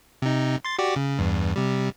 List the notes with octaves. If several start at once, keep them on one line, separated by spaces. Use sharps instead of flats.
C3 D#4
C6 A6
F#4 G4 D5
C#3
E2 G2
C3 G3